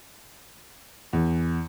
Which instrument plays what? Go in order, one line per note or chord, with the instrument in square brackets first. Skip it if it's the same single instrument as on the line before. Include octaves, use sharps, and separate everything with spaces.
[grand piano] E2